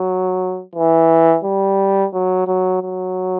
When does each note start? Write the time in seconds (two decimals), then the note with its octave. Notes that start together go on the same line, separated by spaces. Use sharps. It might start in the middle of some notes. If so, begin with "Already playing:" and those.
Already playing: F#3
0.75 E3
1.44 G3
2.13 F#3
2.47 F#3
2.83 F#3